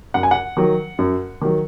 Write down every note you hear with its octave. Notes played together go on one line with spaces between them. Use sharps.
F#2 F#5
G#5
F#5
D#3 F#3
F#2
D#3 F#3